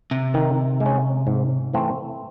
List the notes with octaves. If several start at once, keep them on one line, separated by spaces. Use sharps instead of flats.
C3
D#3
G#3
C#4
G#2
E3 A3 C4